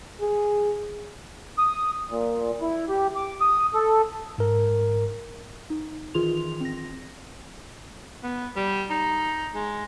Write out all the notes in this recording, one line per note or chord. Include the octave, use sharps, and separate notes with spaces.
G#4
D#6
A#2
E4
G4
D6
D#6
A4
G#2 A#4
D#4
D#3 E3 F4 G#4 C6 F7
C4 A#6
B3
G3
D#4
G#3